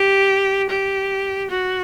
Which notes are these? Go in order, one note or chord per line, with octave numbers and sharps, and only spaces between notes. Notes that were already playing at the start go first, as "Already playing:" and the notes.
Already playing: G4
G4
F#4